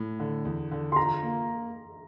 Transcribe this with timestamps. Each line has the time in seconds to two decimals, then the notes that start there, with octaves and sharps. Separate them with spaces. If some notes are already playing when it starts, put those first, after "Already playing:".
Already playing: A2
0.20 D3
0.45 E2
0.72 D3
0.92 C6
0.96 F4 A#5
1.23 A#3